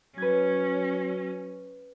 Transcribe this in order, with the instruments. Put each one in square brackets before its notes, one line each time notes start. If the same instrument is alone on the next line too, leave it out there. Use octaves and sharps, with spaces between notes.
[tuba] F#3 [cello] C#4 [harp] B4 G#6